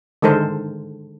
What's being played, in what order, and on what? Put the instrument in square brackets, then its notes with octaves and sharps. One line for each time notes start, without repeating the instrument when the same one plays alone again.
[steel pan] D3 D#3 G#3 A4 A#4 C5